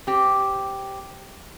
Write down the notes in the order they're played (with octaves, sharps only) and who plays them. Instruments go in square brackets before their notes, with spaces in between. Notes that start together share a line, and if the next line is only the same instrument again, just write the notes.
[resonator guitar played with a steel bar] C4 G4